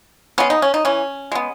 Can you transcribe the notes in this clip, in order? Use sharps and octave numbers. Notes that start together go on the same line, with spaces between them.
G#3 B3 C#4
D#4
C#4
D#4
E3 C#4
G#3 B3